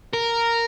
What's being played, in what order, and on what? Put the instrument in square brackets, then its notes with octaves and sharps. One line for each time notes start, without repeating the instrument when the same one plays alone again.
[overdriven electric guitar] A#4